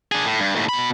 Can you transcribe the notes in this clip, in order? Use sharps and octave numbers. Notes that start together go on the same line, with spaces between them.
D4 G#4
A2
G2
D#2 A2
B2 B5